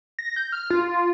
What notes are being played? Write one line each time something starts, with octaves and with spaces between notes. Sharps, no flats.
A#6
G6
F6
F4